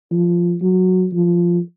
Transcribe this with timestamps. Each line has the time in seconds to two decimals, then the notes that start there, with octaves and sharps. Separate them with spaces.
0.11 F3
0.62 F#3
1.13 F3